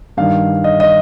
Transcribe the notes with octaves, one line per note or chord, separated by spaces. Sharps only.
G2 D#3 F5
D#5
D#5